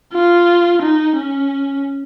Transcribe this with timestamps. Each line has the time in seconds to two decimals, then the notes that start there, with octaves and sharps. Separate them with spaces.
0.13 F4
0.82 D#4
1.17 C#4